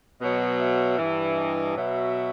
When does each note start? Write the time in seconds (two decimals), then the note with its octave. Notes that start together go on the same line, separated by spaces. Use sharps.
0.20 B2 F#3 D#5
0.59 E5
0.98 G2 E3
1.37 D#5
1.76 B2 F#3 E5